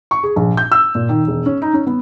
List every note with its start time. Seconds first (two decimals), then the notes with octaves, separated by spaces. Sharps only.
0.11 C#6
0.23 G#4
0.36 A#1
0.57 G6
0.72 E6
0.95 A#2
1.09 D#3
1.27 E1
1.46 C#4
1.62 D#4
1.73 C#4
1.87 B3